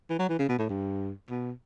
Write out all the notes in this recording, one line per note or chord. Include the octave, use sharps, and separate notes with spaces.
E3
F#3
E3
C#3
B2
A2
G2
B2